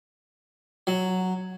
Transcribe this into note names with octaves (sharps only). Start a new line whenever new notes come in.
F#3